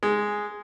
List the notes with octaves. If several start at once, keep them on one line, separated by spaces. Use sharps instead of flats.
G#3